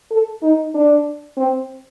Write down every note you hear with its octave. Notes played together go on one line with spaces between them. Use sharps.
A4
D#4
D4
C4